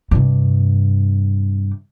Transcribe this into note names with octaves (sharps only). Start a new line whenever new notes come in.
G2 C3